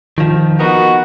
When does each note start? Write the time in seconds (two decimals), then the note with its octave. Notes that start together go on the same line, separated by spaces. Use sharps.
0.18 D#3 F3
0.60 B3 D#4 F#4 A#4